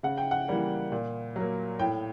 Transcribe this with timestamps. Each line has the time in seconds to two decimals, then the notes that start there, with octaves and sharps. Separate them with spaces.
0.03 C#3 F#5
0.18 G5
0.31 F#5
0.48 E3 G3 A#3
0.92 A#2
1.36 F#3 A#3
1.79 A2 G5